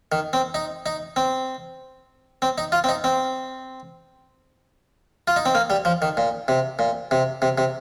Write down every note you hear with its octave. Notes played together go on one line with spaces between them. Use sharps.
D#3
C4
D#4
D#4
C4
C4
D#4
F4
C4
D#4
C4
F4
D#4
C4
A#3
G3
F3
D#3
A#2
C3
A#2
C3
C3
C3